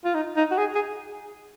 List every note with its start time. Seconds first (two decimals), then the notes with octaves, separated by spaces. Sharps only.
0.05 F4
0.15 D#4
0.37 D#4
0.51 F#4
0.58 G#4
0.75 G#4